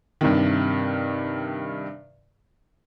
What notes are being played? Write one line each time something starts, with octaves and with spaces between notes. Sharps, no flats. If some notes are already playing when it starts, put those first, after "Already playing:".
G2 C3 D#3